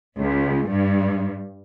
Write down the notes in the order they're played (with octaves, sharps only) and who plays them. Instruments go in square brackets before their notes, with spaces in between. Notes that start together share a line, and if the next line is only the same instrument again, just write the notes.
[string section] C#2
G2